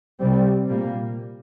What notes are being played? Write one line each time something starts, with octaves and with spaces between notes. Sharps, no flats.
C3 G3 C4
A#2 G3 A#3